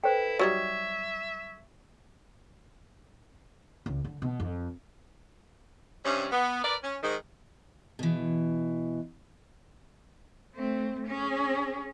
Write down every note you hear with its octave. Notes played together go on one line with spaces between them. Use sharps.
E4 A4 B4 C5 G5
F#3 G3 D#4 E5 C#6 G#6
C#2
D3
B2
F2
G2 C3 G3 C#4
B3
A#4 B4 D5
C#4
G#2 D#3
B2 E3
A3 C4
C#4 G#4